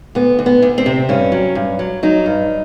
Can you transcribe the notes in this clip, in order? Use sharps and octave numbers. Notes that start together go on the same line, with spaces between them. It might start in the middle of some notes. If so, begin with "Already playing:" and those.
D2 B3
D2
B3
D2
C4
C3
G2 C#4
F#3
G2
F#3
F#3 D#4
G2